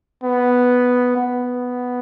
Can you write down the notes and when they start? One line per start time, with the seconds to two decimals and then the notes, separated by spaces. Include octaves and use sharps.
0.23 B3
1.16 B3